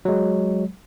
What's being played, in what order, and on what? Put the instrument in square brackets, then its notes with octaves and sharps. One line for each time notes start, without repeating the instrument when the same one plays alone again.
[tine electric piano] F#3 G#3